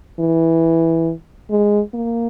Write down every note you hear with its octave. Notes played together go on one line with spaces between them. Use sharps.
E3
G#3
A#3